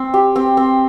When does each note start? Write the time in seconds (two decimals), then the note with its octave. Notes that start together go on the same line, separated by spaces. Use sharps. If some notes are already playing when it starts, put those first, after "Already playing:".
Already playing: C4
0.14 G4
0.36 C4
0.57 C4